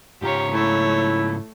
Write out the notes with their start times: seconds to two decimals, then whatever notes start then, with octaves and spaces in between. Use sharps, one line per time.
0.22 G#2 C#3 F4 G4 C#5 A#5
0.52 A3 E4 C#5